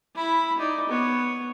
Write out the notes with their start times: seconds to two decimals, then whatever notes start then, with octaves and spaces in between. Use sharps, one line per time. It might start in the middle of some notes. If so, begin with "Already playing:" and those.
0.15 E4 B5
0.58 D#4 D5
0.89 B3 C#5